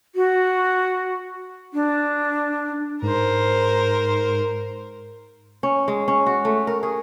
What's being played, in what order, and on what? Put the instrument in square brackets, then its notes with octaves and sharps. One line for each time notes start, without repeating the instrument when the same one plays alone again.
[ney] F#4
D4
[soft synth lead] G#2 [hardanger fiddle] A#4 C5
[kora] C#4
G#3
C#4
F#4
A3
A#4
G#4